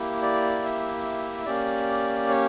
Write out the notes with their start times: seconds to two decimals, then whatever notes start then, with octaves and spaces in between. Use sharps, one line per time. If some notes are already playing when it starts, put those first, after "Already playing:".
Already playing: A#3 E4 G4
0.22 D5
0.64 E5
1.46 A#3 C#4 G4 D5
2.29 C#5